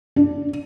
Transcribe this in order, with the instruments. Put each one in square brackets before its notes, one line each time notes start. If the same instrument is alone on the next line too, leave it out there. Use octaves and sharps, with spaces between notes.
[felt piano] D4